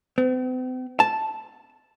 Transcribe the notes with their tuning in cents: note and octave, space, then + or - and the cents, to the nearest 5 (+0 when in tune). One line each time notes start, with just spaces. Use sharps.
C4 -45
A5 -5